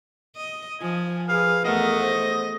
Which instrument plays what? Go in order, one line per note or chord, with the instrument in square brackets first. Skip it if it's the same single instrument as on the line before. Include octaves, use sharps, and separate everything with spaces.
[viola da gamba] D#5
[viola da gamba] F3 [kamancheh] G#5
[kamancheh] G#4 B4 [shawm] F5
[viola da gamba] E2 A3 [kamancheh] A#4 F#5 [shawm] D#5
[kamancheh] C5